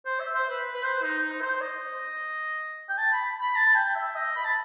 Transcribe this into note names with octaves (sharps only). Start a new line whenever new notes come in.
C5
E5
C5
B4
B4
C5
D#4
D#4
C5
D#5
G5
A5
B5
B5
A5
G5
E5
D#5
B5
A5